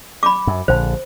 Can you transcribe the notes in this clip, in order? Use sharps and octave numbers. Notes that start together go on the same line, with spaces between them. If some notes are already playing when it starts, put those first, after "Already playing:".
B5 D6
F#2
A#1 D3 C5